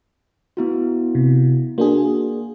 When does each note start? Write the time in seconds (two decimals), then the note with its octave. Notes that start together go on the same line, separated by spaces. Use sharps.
0.57 B3 E4 F#4
1.15 C3
1.78 A#3 D4 F#4 G#4